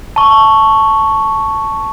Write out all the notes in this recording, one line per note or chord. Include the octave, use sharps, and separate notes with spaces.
A5 C#6